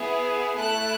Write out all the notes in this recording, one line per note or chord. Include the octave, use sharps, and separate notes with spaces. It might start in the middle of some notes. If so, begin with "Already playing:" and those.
Already playing: B3 E4 G#4
A3 E4 A4 F#6